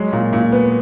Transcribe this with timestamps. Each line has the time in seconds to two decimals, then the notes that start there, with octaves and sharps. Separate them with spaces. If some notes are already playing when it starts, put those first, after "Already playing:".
Already playing: F#3 G#3
0.12 A#2
0.33 A#2
0.52 B3